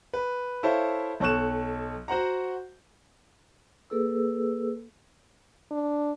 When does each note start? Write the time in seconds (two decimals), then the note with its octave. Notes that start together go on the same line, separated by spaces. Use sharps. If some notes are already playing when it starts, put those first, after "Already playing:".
0.14 B4
0.63 E4 A4 C5 C#5 E5 F5
1.20 B1 A4 C#5 C#6 F#6 E7
2.08 F#4 C5 F#5 A#5
3.90 A#3 G#4 A4 B4 E6
5.71 D4